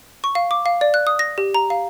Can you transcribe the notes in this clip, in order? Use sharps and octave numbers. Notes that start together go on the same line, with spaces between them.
C#6
F5
D6
F5
D5
F#6
D#6
A#6
G4
A#5
F5